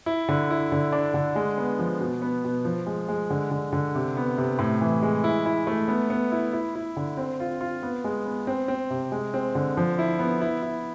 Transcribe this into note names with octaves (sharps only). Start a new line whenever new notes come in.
E4
D3
E4
D3
D4
D3
G#3
B3
F3
B2
B3
B2
F3
G#3
G#3
D3
D3
D3
C3
B3
C3
A2
E3
G#3
E4
E4
A3
B3
B3
E4
E4
E4
D3
C4
F4
F4
B3
G#3
B3
C4
C4
C3
G#3
C4
D3
F3
E4
B3
E4
E4